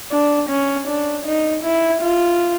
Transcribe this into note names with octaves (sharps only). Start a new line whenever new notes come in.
D4
C#4
D4
D#4
E4
F4